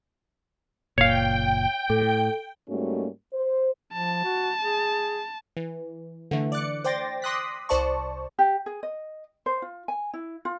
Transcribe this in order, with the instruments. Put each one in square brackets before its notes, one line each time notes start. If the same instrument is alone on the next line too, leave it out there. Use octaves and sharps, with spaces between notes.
[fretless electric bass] F#1 A#2 [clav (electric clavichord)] C#5 F5 [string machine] G5
[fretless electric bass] A2 [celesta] A4
[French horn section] G#2 G3 A3 A#3 C#4 F#4
C5
[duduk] F3 [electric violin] A5
[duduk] F#4
G#4
[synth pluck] E3
D3 E3 A3
D5 D6 F#6 C#7
C5 D5 G5 C6 A6 A#6
C6 D6 D#6 F#6 A#6 B6
C2 C5 D5 A5 C#6
[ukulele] G4
G#4
D#5
C5
F4
G#5
E4
F4